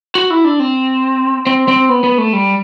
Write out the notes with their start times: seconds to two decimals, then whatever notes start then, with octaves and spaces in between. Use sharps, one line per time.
0.15 F#4
0.30 E4
0.45 D4
0.60 C4
1.47 C4
1.68 C4
1.89 B3
2.04 B3
2.18 A3
2.33 G3